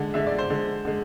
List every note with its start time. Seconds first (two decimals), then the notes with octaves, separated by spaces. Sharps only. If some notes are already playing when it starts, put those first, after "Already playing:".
Already playing: D3 G#3
0.14 D3 G#3 E5
0.27 D5
0.38 C5
0.50 D3 G#3
0.85 D3 G#3